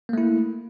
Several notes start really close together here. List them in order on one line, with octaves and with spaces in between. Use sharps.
A#3 A3 E4